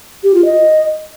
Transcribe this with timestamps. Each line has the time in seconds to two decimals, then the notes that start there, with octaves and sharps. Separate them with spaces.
0.24 G4
0.34 F4
0.45 D#5